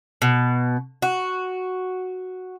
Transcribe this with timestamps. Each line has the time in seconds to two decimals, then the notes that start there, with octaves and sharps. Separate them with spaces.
0.22 B2
1.02 F#4